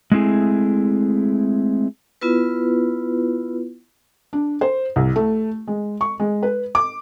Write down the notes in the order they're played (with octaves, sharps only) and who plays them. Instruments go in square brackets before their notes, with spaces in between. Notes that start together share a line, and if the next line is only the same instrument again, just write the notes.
[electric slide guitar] G#3 A3 C4 E4 G#4
[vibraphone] B3 E4 F4 B4
[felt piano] D4
C5
C2
A3
G#3
C#6
G#3
B4
D6